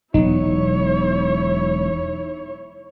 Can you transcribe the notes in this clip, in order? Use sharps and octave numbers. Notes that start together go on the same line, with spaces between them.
E1 F#3 B3 D#4 E4 C#5